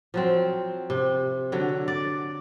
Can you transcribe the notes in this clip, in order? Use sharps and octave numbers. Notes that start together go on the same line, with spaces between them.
F3 F#3 C4
C3
D3 F#3
D5